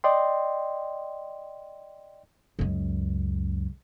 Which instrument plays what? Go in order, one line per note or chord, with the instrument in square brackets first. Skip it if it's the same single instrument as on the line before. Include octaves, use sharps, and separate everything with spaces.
[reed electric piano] D5 D#5 G5 C6
[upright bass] C#2 F#2